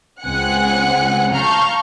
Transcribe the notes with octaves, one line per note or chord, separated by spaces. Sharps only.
C#2 C4 F#5 G#5 F#6 C#7
F5 A5 A#5 C#6 F6 G6